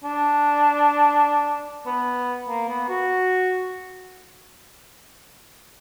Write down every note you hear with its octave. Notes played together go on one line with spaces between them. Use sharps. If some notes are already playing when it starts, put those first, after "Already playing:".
D4
B3
A#3
B3
F#4